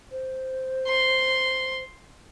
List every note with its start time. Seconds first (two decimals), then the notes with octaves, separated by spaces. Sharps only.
0.12 C5
0.88 C6